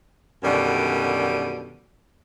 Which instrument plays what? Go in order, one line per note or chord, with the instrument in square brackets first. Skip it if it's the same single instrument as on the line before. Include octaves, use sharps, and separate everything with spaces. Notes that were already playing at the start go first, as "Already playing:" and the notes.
[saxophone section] F#2 B2 D3 D#3 G3